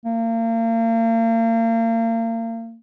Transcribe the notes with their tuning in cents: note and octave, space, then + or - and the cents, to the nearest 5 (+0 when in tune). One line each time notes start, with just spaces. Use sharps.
A#3 -35